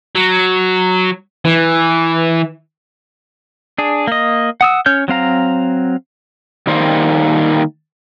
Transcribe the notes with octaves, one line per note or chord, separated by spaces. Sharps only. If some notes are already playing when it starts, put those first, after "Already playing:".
F#3
E3
D4 G#4
A#3 D#5
F#5 D#6 E6
C#4 C#5 F6 G6
F#3 C4 F5 A#5
D#3 G3 A#3 C5